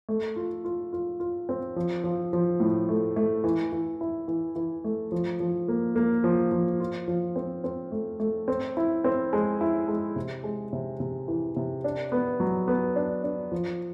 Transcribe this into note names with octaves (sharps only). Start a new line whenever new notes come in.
A3
F4
F4
F4
F4
C4
F3
F3
F3
A2
A3
A3
E3
E3
E4
E3
E3
A3
F3
F3
A#3
A#3
F3
F3
F4
F3
C4
C4
A3
A3
C4
E4
C4
G#3
E4
G#3
C3
G#3
C3
C3
E3
C3
D4
B3
F#3
B3
D4
D4
F3